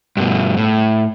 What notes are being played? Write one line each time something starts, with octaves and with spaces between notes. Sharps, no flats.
G2 B2
A2